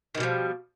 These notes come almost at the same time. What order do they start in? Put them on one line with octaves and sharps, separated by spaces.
D#3 B2 G3 F3